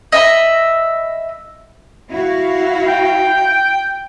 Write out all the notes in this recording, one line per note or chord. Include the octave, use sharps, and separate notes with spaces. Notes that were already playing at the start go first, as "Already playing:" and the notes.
D#5 E5 B5
E4 F#4 F5
G5